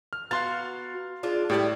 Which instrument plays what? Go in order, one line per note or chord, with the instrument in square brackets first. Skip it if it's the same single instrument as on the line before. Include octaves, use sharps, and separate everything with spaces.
[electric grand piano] F6
[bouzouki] B3 F#4 A#5 [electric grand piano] F5 C6 A6
[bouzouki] G#3 D4 F4
[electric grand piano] A2 G4 D5 [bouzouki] G3 G#5 A5